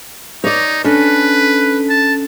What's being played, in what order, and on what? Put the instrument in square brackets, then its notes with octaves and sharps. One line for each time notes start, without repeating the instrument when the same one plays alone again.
[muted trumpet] D#4 [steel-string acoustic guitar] C#5 D5
[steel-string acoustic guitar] C#4 D4 A4 [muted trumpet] B4
[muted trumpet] A5